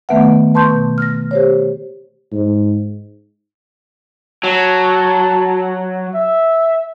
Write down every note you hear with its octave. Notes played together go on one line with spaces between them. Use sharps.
D#3 A3 B3 B4 E5 F#5
B4 A5 C6 C#6 G6
B2
F6 A#6
G4 C5 C#5
G#2
F#3 A5
E5